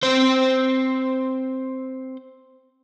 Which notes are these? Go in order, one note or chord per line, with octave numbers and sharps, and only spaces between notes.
C4 C5